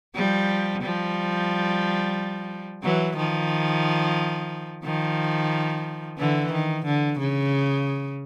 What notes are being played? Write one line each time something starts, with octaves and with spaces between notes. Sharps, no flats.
F3 G3
F3 G3
E3 F#3
D#3 F3
D#3 F3
D3 E3
D#3
D3
C#3